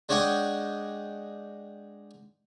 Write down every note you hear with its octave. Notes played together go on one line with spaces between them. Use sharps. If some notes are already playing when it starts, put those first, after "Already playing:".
G#3 D4 C#5 D#5 F#5 G5